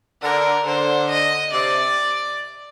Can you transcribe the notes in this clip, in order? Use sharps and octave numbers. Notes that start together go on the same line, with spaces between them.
D3 A#4
D3 C5
D#5
C3 D5